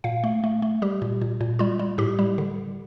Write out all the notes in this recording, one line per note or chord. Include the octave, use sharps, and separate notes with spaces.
A#2 F5
A3
A3
A3
G3 G4
A#2
A#2
A#2
G3 F4
G3
A2 G4
G3
D3